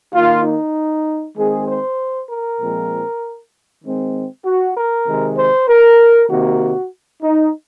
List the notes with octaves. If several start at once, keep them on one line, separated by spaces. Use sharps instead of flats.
D#3 A#3 F4
D#4
D#3 G#3 C4 G#4
C5
A#4
A#2 F3 G#3 C4
D#3 G#3 C4
F#4
A#4
C3 D#3 G#3
C5
A#4
C3 D#3 A#3 F#4
D#4